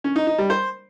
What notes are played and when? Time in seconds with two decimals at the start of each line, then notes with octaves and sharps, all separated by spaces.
0.04 C#4
0.16 D#4
0.27 D#4
0.38 G3
0.50 C5